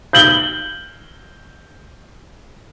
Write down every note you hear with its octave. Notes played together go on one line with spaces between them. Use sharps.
G6 F#7 G7